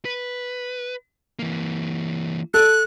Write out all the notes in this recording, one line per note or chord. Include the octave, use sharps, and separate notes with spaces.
B4
E3 A#3
A4 F#6